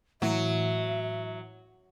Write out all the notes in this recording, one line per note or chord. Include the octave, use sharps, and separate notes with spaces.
A2 E3 F#3 E5